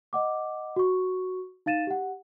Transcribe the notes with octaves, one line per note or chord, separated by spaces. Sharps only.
D#5 F#5 D6
F#4 C#6
D#4 F5 A6 D#7 E7
G4 F#5